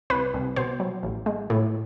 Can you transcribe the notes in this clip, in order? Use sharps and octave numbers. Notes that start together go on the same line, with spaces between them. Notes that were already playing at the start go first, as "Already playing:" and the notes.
C2 B4
C2
B2 C5
F#3
A1
G#3
A2